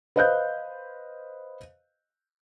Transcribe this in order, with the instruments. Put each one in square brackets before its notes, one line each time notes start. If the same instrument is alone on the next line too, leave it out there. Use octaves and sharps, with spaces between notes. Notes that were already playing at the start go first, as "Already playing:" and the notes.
[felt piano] B4 C5 D#5 F5 F#6 G6